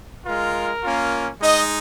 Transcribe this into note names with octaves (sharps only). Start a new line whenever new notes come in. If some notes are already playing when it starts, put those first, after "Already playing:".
G#3 F4 A#4
A#3 C#4 F4
G#3 D#4 D#5